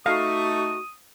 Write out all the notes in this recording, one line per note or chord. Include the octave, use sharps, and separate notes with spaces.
A3 D#4 F#4 F5 D#6